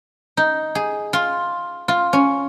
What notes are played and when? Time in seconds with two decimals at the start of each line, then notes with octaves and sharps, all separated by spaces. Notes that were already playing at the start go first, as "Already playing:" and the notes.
0.37 D#4
0.75 G#4
1.13 F4
1.88 F4
2.13 C#4